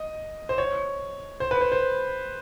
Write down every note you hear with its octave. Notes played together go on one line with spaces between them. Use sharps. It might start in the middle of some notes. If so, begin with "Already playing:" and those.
Already playing: D#5
C5
C#5
C5
B4
C5
C5